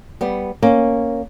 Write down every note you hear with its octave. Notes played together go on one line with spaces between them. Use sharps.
G3 B3
A#3 C#4